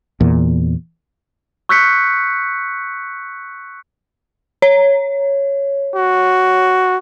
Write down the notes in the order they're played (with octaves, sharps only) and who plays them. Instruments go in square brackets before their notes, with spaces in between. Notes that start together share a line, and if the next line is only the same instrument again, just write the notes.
[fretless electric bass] E2 A#2
[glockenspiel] C#6 E6 F#6 G6 B6 C#7
[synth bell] C#5
[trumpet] F#4